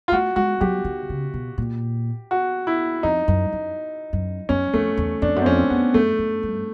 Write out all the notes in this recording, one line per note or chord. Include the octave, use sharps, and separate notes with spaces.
F4
A3 F#4
G#3 F#4
F#3 G4
D#3
C#3
B2
A#2
F#4
E4
F2 D#4
F#2
F#2
F#2
F#2 C#4
F2 A3
E2
F2 D4
F#2
C4
F2 C#4
F2 B3
F#2 A3
F#2
G2